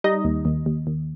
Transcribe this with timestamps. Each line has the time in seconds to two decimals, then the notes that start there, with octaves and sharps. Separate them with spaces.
0.04 G3 D#4 D#5
0.25 D#2
0.45 D#2
0.66 D#2
0.87 D#2